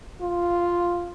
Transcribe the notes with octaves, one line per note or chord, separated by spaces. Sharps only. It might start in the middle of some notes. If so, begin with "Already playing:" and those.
F4